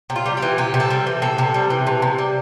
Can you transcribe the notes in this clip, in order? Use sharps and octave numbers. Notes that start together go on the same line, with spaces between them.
C3
F4
G3
G4
E3
C3 G4
C3
A4
G3
E3
C3 A4
C3
G3
E3
C3
C3
G3